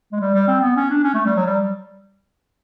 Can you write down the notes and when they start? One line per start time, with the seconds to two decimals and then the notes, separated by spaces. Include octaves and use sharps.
0.12 G#3
0.20 G3
0.34 G3
0.48 C4
0.61 B3
0.76 C#4
0.90 D4
1.03 C#4
1.14 A3
1.25 G3
1.36 F#3
1.46 G3